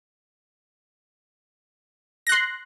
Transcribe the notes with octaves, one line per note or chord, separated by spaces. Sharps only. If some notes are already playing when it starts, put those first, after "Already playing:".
C6 F#6 A#6